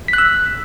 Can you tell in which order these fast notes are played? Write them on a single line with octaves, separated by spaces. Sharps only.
B6 F#6 E6